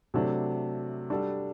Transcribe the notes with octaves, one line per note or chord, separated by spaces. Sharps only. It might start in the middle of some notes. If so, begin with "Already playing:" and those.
C3 F#3 A3 D4
G3 D4 F#4 A4